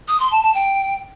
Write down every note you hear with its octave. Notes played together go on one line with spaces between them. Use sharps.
D#6
C6
A5
A5
G5